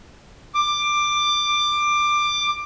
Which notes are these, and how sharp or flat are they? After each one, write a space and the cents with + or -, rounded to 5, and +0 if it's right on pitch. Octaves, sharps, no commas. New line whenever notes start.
D6 +15